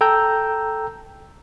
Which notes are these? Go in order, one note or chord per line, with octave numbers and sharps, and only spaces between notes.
A4 G5 A#5 E6 G6